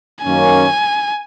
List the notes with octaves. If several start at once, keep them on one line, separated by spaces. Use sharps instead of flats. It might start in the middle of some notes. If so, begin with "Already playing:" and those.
F#2 D#3 A#3 C#4 G#5